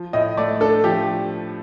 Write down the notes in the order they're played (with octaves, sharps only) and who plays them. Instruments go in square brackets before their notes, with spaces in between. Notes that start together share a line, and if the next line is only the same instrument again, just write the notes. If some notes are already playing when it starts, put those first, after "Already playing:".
Already playing: [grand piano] F3
[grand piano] A2 [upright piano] D#5
[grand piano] A3 [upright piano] D5
[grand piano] D4 [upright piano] A4
[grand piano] F3 [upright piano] G4